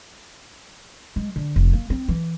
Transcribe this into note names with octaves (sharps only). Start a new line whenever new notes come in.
G#3
D3
F1
A#3
C4
E3